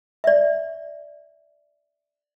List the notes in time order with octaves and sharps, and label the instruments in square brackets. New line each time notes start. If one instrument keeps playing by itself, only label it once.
[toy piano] D5 E5